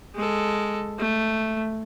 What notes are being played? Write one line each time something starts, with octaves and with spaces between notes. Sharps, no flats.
G#3 A4
A3